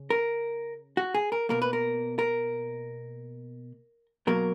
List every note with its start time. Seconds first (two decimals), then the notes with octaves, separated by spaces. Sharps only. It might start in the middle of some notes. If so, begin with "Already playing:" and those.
Already playing: C#3
0.10 A#4
0.97 F#4
1.14 G#4
1.32 A#4
1.49 B2 A#3 A#4
1.62 B4
1.73 A#4
2.19 A#4
4.27 B2 F#3 A#3 A#4